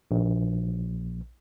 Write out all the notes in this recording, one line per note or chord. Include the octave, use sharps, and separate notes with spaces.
A#1